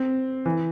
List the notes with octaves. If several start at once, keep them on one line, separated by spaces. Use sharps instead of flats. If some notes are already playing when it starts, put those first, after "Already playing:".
Already playing: C4
E3